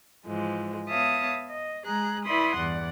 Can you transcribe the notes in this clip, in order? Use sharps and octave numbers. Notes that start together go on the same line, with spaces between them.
G#2 E3 F3 G#3
B3 C#5 E5 F5 A5 D#6
D#5
G#3 G#4 A#5 F#6
E4 B4 D5 B5 C6 D#6
E2 G2 D5 F#5